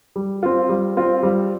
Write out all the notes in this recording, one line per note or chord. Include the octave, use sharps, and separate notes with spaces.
G3
C4 F4
G3
C4 F4
G3